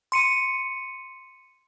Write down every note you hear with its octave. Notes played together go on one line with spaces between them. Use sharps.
C6 C#7 D#7